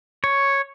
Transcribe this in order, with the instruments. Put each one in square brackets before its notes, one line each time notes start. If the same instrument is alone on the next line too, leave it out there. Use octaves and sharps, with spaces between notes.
[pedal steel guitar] C#5